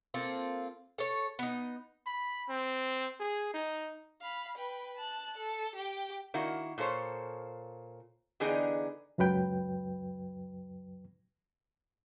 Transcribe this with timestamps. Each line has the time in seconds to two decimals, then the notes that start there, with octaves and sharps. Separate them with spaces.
0.14 A#3 C4 F4 A4
0.98 A4 C#5
1.39 B3 D#4
2.07 B5
2.49 C4
3.20 G#4
3.54 D#4
4.21 F5 B5
4.57 B4 G5
4.97 A5 F#6
5.37 A4
5.75 G4 G5
6.34 D#3 A#3 E4 F#4
6.78 A#2 A#3 A4 C5 C#5
8.40 D3 E3 B3 D#4 G#4 G5
9.18 C#2 F#2 F#3 B4 G5